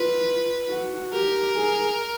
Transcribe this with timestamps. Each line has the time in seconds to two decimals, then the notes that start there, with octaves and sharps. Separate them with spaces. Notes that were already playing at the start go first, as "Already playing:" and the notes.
Already playing: F4 B4
0.69 F#4
1.12 G4 A#4
1.56 G#4